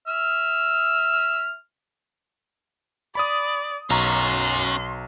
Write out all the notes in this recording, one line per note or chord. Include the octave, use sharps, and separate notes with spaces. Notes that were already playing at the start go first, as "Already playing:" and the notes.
E5 F6
D5 B5 D#6
B1 C#4 F#4 A#5 C6